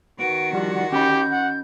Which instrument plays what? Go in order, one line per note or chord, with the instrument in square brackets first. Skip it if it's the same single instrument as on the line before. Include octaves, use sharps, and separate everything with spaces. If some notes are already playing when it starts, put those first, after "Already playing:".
[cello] D#3 F#4 [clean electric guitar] B3 [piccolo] D7
[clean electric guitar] F3 G3 D4 [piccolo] F#5
[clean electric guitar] C#4 D#5 B5 [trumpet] G4 [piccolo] G6
[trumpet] F#5